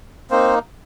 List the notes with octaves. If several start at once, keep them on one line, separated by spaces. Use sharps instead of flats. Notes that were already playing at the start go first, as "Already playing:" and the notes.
A#3 C4 D#4 C5